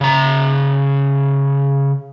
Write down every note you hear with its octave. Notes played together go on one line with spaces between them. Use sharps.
C#3 A#5